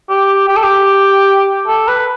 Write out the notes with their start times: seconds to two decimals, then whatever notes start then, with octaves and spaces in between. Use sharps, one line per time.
0.09 G4
0.48 G4
0.56 A4
0.63 G4
1.67 A4
1.88 B4